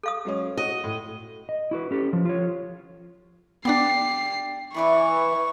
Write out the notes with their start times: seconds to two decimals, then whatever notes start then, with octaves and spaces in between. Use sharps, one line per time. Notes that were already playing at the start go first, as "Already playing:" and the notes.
0.03 A4 F5 D#6
0.25 F#3 G#3 C#4
0.57 F#4 D#5
0.84 A2
1.49 D#5
1.71 E4 F#4 B4
1.91 C#4 G4 A4
2.13 F3
2.25 F4 C#5
3.65 B3 D4 G4 D5 C7
4.74 E3 B4 D5 B5 C#6